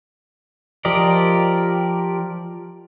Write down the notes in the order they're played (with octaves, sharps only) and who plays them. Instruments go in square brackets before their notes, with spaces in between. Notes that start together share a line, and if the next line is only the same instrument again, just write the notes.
[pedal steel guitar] F3 G4 A#4 D5 D#5